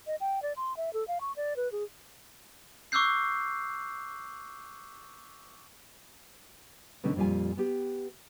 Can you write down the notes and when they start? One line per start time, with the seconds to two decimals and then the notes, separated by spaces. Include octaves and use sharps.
0.07 D#5
0.21 G5
0.43 D5
0.56 C6
0.77 E5
0.93 A4
1.08 F5
1.21 C#6
1.37 D5
1.56 B4
1.72 G#4
2.92 C#6 D6 E6 F#6 G6 C7
7.04 B2 D3 A3 C#4 D#4
7.16 F2 A#2 G3 F4 G#5
7.57 B3 G4